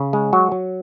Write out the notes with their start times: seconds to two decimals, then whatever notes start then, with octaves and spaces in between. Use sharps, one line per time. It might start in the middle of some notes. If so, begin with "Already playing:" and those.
Already playing: C#3
0.13 G#3
0.33 F#3 F#4
0.52 F#3